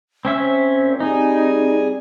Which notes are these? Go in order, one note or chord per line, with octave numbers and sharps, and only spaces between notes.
C4 C#4 E5
C5
A#2
G3 C4 D#4 G#4 G#5